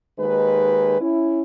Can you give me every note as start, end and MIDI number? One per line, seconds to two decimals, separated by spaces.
0.18 0.97 39
0.18 0.97 51
0.18 0.97 56
0.18 0.97 71
1.00 1.42 61
1.00 1.42 64